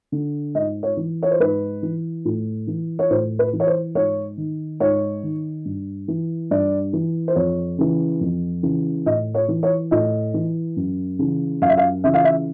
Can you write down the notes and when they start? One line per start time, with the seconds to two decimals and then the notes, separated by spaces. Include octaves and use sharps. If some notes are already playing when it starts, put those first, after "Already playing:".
0.12 D3
0.55 G#2 D#5
0.83 C#5
0.97 E3
1.23 C#5
1.31 C5
1.40 G#2 B4
1.83 E3
2.25 A2
2.67 E3
2.99 C#5
3.10 A2 C5
3.39 B4
3.53 E3
3.60 C#5
3.67 C5
3.95 G#2 C#5
4.37 D#3
4.80 G#2 C#5
5.23 D#3
5.65 G2
6.08 E3
6.51 G2 D5
6.93 E3
7.28 C5
7.35 F2 C#5
7.78 C#3 E3
8.21 F2
8.63 C#3 E3
9.06 A2 D#5
9.35 C#5
9.48 E3
9.63 C#5
9.91 A2 D#5
10.34 E3
10.77 F#2
11.19 C#3 E3
11.62 F#2 F5
11.69 E5
11.77 F5
12.04 C#3 E3 E5
12.14 F5
12.24 E5